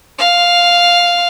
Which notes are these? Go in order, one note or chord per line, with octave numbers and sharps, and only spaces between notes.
F5